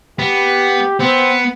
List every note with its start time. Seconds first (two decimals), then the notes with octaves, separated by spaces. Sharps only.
0.19 B3 G4
1.00 B3 C4